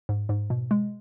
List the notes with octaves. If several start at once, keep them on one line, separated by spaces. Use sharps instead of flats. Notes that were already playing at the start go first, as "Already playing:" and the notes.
G#2
G#2
B2
G#3